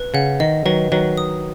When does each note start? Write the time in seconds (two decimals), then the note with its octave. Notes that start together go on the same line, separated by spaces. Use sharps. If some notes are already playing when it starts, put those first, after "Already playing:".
Already playing: B4
0.14 C#3 F#5
0.40 D#3 D#5
0.66 D#3 F#3 B4
0.92 D#3 F#3 B4
1.17 D#6